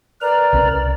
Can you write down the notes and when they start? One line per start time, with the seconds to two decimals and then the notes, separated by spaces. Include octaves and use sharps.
0.22 A#4 B4 D5 A#5
0.53 C2 C#4